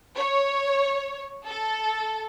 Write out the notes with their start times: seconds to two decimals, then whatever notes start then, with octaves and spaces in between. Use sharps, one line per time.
0.17 C#5
1.47 A4